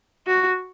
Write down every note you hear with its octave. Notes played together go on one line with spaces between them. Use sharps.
F#4